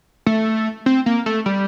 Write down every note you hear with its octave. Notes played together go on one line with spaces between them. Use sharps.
A3
C4
A#3
A3
G3